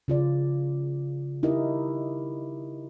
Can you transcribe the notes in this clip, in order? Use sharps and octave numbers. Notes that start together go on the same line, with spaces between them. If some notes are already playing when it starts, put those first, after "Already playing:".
C#3 F4 D5
D#4 E4 G4 A#4 D#5